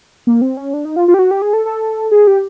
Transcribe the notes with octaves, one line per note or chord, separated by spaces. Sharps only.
A#3
C4
C#4
D4
D#4
F4
F4
G4
F#4
G4
G#4
A4
A4
G#4
G4